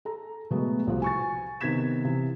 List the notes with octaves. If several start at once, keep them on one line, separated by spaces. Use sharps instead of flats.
A4 A#5
B2 F#3 G#3 A3 B3
C2 F3 F#4
G#5 C#6 A6
C3 D#3 B3 G#6 B6 E7
C3 E3